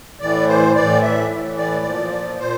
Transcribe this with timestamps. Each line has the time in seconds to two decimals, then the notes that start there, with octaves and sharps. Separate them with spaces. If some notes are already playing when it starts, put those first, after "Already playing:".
0.21 A2 E3 D5
0.48 C5
0.75 A2 E3 D5
1.03 E5
1.30 A2 E3
1.58 D5
1.85 A#2 F3
2.39 A#2 C5